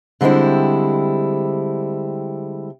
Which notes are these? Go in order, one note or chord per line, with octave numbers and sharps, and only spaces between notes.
D3 G3 G#3 C4 E4